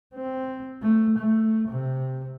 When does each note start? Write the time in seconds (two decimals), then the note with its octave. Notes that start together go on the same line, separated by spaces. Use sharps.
0.15 C4
0.82 A3
1.18 A3
1.68 C3